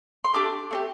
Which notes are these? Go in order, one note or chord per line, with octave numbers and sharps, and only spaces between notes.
C6
A3 D4 G4 D6
A3 D4 G4